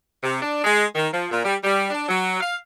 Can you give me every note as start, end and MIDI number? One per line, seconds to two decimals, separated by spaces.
0.23 0.42 48
0.42 0.64 62
0.64 0.83 56
0.95 1.09 51
1.12 1.28 53
1.31 1.42 46
1.45 1.56 55
1.64 1.87 55
1.91 2.04 62
2.09 2.40 54
2.41 2.55 77